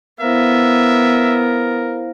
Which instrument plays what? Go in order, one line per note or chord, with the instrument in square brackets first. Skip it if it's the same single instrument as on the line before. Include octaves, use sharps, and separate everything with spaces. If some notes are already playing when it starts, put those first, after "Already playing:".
[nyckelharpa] B3 [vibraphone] E4 C5 F5 [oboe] A#4 [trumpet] E5